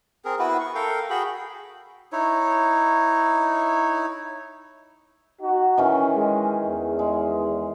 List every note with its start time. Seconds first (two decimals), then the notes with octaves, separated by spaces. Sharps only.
0.25 C4 G#4 A#4
0.39 B3 E4 F#4 B4
0.60 C#6
0.75 A4 A#4 F5 G5
1.10 F#4 G#4 G5 B5
2.12 D#4 E4 C#5
5.42 D#4 F#4
5.77 D#3 E3 C#4
6.16 G#3
6.67 E2
6.99 G#3